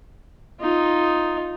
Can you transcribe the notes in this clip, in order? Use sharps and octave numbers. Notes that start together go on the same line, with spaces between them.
D#4 F4